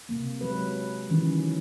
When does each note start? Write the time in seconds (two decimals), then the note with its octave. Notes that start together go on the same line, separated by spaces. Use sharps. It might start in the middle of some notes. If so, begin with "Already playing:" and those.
0.09 C3 A#3
0.41 F#3 G#3 B4
1.10 D#3 E3 F#3 C#4